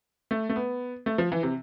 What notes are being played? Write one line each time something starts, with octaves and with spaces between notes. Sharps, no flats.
A3
A3
B3
A3
F3
E3
C3